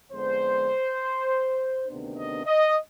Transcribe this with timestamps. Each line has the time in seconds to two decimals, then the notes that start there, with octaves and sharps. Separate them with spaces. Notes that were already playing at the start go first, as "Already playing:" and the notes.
0.12 F2 D3 G#3 B3 D4 C5
1.87 D2 C3 D#3 B3 D4
2.17 D#5
2.46 D#5